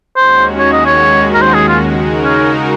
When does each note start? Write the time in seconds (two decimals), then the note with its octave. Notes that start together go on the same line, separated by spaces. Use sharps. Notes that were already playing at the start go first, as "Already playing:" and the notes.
0.16 D#2 D#3 G#3 C#4 F#4 C5
0.58 C#5
0.72 D#5
0.86 C#5
1.34 A#4
1.41 C5
1.54 G#4
1.68 F4
1.82 C#3 G#3 D#4 F#4 A#4
2.24 C#4